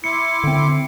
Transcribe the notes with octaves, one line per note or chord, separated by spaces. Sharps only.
E4 C6 D6 C#7
D3 C4